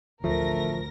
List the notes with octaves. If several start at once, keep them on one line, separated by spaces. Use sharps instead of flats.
A1 D2 F3 A3 A#4 A#6